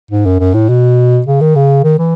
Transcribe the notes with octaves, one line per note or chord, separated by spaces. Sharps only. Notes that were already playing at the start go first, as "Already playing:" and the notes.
G#2
F#2
F#2
A2
B2
C#3
D#3
C#3
D#3
E3